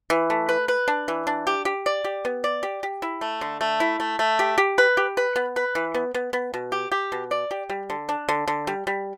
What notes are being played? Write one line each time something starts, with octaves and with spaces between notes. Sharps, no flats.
E3
A3
B4
B4
D4
E3
D4
G4
G4
D5
G4
B3
D5
G4
G4
E4
A3
D3
A3
E4
A3
A3
G4
G4
B4
G4
B4
B3
B4
E3
B3
B3
B3
B2
G4
G4
B2
D5
G4
G3
D3
D4
D3
D3
G3
G3